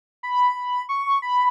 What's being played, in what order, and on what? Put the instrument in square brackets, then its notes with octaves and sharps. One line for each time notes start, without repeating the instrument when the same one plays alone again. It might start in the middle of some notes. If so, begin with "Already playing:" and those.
[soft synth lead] B5
C#6
B5